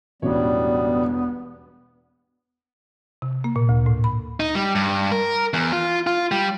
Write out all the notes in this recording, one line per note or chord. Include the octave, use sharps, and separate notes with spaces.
E1 A1 B2 G3 B3 D4 C#5
C3
A#3
A#2
D2
A2
B5
D#4
G3
G2
A#4
E2
F4
F4
G3